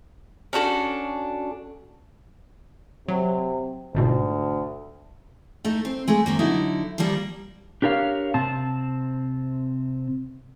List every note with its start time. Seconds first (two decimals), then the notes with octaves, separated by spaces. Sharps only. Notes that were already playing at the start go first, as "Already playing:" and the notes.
0.53 C#4 D4 F#4 A4
3.08 C3 F#3
3.94 G1 D2 G#2 B2
5.65 A3 D#4
5.85 C4
6.08 G#3 A3
6.26 C3 D#3 A#3
6.39 D3 F#3 D#4 E4
6.98 D#3 F3 G3 A#3
7.82 D4 G4 A#4 C#5 F5
8.34 C3 C4 A5